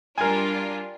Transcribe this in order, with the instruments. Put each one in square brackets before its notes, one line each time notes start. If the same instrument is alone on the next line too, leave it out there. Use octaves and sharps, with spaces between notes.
[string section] G3 D4 F4 [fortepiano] A#4 G#5